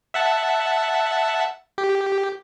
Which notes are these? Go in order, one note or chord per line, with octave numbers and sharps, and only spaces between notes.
E5 F#5 A5
G4